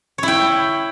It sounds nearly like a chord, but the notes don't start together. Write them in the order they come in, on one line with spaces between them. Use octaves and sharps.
C#5 E4 G5